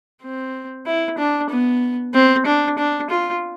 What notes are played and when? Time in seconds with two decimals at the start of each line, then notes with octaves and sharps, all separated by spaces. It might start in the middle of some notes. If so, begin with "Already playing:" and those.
0.22 C4
0.86 E4
1.18 D4
1.50 B3
2.13 C4
2.46 D4
2.78 D4
3.10 F4